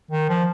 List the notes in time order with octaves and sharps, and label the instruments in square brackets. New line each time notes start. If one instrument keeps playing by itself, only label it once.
[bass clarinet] D#3
F3